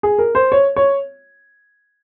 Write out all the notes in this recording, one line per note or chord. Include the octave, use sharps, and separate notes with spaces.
G#4
A#4
C5
C#5
C#5